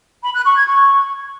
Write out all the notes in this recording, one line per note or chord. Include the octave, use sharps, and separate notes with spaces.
B5
F#6
C#6
G#6
C#6